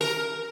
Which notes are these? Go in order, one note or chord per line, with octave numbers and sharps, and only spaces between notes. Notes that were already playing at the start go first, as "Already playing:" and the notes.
A#4